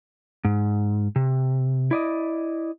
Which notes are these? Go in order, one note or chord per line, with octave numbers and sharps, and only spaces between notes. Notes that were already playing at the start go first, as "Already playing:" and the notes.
G#2
C3
E4 D5 D#5